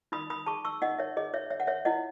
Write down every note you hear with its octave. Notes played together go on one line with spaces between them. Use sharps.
D#4 B5 D#6
B5 D#6
G#4 A5 C#6
C#6 E6
D#4 D#5 F#5
C#5 E5
G#4 D#5
C#5 E5
C#5 E5
F#5
C#5 E5
E4 D#5 F#5